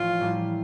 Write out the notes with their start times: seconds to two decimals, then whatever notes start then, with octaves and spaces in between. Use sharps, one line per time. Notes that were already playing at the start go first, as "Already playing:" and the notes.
Already playing: A1 F3 F4
0.20 A2 G3 A#3 E4